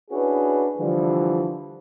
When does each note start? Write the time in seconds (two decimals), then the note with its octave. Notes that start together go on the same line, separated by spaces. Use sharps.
0.11 C#4 D4 E4 F#4 G#4 B4
0.78 D3 E3 F3 G3